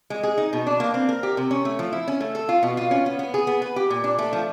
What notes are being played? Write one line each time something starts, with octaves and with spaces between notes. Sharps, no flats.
G#3
G#4
D#4
B2
D4
A#3
C4
A#4
G4
C3
C#4
A3
F3
E4
C#4
A3
A4
F4
B2
F4
C#4
B3
B3
G#4
B3
B4
G4
A#2
D4
A3
F3